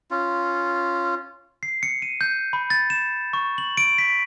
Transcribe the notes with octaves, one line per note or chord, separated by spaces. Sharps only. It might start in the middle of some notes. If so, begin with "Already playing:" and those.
C#4 F4
C7
C#7
D#7
G6
B5
A6
E7
C#6
F#7
D7
B6